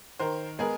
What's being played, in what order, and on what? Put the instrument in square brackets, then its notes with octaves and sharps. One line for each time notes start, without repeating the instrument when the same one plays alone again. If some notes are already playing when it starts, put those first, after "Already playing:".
[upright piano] D#3 A#4 C5
G#3 B3 G#4 A#4